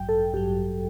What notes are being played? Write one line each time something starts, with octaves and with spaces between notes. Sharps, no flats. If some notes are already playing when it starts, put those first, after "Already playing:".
Already playing: A1 G2 F#3 G5
A4
A1 G2 F#3 G4